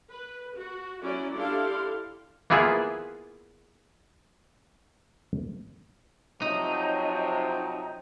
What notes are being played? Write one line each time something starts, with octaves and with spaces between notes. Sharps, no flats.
B4
F#4
F#3 C#4 E4 D5
D4 E4 G4 A4 F5 C6
A#3 B3 E4 F4 G#4
C3 F3 F#3 D#4